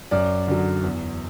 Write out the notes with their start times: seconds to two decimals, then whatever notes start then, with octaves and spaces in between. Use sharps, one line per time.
0.11 F#2 D5
0.48 D3 F#3
0.83 E2